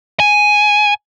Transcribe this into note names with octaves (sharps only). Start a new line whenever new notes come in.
G#5